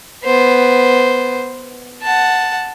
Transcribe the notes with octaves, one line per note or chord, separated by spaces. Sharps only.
B3 C5
F#5 A5